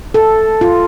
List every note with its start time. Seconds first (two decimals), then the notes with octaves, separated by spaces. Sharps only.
0.14 A4
0.61 F4